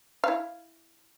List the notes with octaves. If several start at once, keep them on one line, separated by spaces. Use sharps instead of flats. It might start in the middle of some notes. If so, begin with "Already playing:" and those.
E4 F5